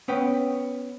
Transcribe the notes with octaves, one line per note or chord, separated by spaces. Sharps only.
B3 C#4 B4 G5